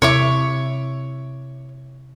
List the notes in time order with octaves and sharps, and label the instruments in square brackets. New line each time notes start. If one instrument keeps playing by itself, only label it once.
[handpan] C3 E4 E5 [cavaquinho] C#5 C#6 D6